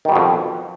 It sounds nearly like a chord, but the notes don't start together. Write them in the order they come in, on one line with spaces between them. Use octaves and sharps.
D#3 G3 B2 F2